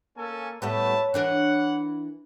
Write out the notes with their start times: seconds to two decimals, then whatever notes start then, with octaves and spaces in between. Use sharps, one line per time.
0.17 A#3 C#4 A4 G#5
0.62 A2 G3 B3 B4 C#5 E5 A5
1.14 E3 D4 A#4 F#5